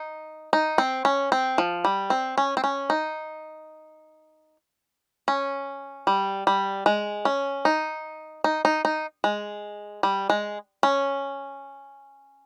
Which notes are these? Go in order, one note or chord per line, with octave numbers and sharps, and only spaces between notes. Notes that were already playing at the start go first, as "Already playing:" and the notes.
Already playing: D#4
D#4
C4
C#4
C4
F3
G3
C4
C#4
C4
C#4
D#4
C#4
G3
G3
G#3
C#4
D#4
D#4
D#4
D#4
G#3
G3
G#3
C#4